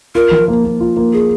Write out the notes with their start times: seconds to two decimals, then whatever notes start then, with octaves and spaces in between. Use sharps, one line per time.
0.15 F4 A#4
0.31 F3
0.48 A#3
0.64 A#3
0.81 F4
0.97 A#3
1.13 G#4